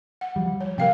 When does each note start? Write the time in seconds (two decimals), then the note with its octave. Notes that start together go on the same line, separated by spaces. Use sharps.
0.21 F#5
0.36 F3 G3
0.61 C#5
0.78 C3 G3 A#4 F5 G5